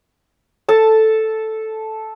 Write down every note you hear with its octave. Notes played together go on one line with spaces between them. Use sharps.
A4 A5